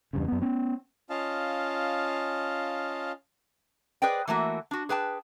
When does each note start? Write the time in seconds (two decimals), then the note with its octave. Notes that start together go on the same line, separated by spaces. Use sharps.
0.13 E2 G2 C#3
0.28 F#2 B3
0.42 B3 C#4
1.10 C#4 F4 D#5 F5 A5
4.02 G#4 B4 C5 D5 D#5 G5
4.28 E3 A3 A#3 F#4
4.71 D4 F#4
4.89 G#4 B4 G5 A5